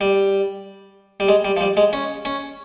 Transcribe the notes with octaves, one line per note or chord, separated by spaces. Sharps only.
G3
G3
G#3
G3
F3
G3
G#3
C#4
C#4